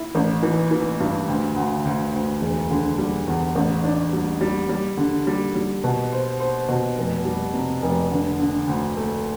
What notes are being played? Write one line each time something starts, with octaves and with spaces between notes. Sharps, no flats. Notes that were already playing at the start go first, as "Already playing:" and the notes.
Already playing: E4
A1
E3
E3
G2
D2
D2
D2
D2
E1
D3
G3
E2
A1
D4
G3
G3
G3
D3
G3
G3
B2
C5
C5
B2
F1
G3
C3
F1
D3
D3
D2
A3